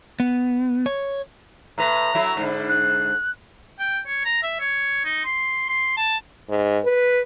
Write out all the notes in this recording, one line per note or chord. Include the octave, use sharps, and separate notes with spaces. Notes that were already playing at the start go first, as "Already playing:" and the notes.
B3
C#5
A2 B4 A#5
F#3 E4
G#2 D3
F#6
G5
C#5
A#5
E5
C#5
D#4
C6
C6
A5
G#2
B4